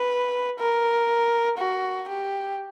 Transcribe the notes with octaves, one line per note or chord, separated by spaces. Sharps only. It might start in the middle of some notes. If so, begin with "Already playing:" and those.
Already playing: B4
A#4
F#4
G4